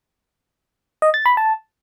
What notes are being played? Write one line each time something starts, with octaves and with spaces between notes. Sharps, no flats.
D#5
A6
B5
A5